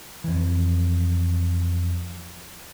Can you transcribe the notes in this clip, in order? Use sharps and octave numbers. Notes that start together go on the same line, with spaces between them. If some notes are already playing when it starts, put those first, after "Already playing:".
F2 E3